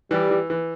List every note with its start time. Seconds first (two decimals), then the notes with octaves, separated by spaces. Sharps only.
0.11 E3 G3
0.30 E3
0.50 E3